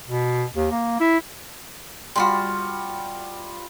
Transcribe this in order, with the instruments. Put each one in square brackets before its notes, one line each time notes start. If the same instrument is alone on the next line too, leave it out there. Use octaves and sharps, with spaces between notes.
[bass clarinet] B2
D#2
A#3
E4
[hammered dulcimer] G3 F4 [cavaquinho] F#4 B5 C6